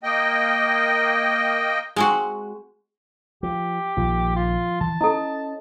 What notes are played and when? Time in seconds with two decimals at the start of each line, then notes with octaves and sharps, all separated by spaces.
0.03 A#3 D#5 G5
1.96 G#3 C4 F#4
3.43 F3 G4
3.97 A#1 D#3 F3
4.36 F4
4.81 E3 A5
5.01 C#4 E4 A4 D#5